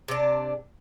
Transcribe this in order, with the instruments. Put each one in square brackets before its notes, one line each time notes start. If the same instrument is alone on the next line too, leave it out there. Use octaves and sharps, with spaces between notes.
[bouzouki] C3 D4